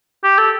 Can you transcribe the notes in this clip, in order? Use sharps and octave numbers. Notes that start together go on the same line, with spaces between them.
G4
A4